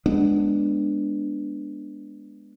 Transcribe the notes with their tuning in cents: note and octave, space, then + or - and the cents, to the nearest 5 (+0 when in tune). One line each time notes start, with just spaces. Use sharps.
G#3 +0 B3 +0 D4 +5